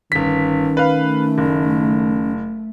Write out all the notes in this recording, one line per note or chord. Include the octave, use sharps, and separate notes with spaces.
G1 D#3 C#4 B6
A3 B4 F5
F#1